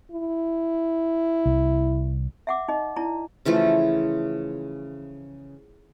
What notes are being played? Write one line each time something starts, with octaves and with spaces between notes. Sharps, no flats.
E4
C2
E5 F#5 D6
D#4 D#5
D#4 E4 D5 A#5
C#3 E3 F3 A3